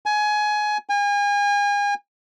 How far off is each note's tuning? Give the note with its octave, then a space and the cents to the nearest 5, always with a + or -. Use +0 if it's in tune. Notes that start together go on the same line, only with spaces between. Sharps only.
G#5 +20
G#5 -35